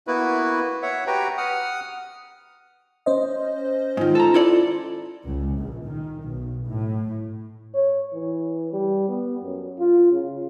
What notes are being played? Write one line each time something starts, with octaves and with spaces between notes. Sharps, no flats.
A#3 B3 E4 F#4 B4
C#5 E5 F#5
F#4 G4 B4 G5 A#5
F#5 D#6 F6
C#4 C5 D#5
G#2 D#3 F4
A4 A#5
E4 A4 D5
C#2
A#1
D#3
B1
A2
C#5
E3
G3
B3
F#2
F4
C#3